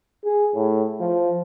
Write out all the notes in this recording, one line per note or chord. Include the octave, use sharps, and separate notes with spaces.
G#4
A2
F3